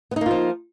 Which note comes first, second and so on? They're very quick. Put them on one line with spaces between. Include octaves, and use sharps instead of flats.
B3 D#4 A#3 F4 F3